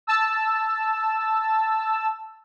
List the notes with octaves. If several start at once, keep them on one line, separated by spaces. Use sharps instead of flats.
A5 E6